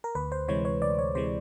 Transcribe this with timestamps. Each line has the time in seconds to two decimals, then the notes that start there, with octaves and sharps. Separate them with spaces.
0.04 A#4
0.15 D2 B4
0.32 C5
0.48 C3 E3 G#3 C#5
0.65 C#5
0.82 D2 D5
0.99 C#5
1.15 C3 E3 G#3 C5